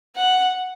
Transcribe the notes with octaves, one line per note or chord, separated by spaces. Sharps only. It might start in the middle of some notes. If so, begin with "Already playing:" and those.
F#5